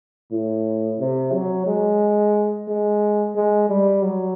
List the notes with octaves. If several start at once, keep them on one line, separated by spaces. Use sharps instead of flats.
A2
C3
F#3
G#3
G#3
G#3
G3
F#3